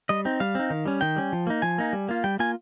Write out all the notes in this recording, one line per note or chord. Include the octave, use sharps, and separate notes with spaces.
G3 D#5
C4 D#4
G3 F5
C4 D#4
D#3
G3 C#4
D#3 G5
G3 C#4
F3
A#3 D#4
F3 G#5
A#3 D#4
G3
A#3 F4
G3 G5
A#3 F4 G#5